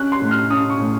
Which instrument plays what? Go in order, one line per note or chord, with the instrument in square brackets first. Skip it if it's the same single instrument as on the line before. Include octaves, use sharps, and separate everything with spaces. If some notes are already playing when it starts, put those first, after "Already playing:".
Already playing: [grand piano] C#4 F#6
C6
A2
F6
C#4 D#6
C#6
A2